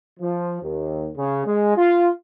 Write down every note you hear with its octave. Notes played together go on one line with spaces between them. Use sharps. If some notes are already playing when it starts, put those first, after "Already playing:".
F3
D#2
C#3
G#3
F4